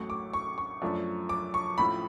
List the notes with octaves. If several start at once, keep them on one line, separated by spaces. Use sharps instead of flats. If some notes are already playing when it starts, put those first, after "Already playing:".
Already playing: A1 A2 F#3 A3 C#6
D6
C#6
C#6
F#2 F3 A3 D4
D6
C#6
A1 A2 F3 B5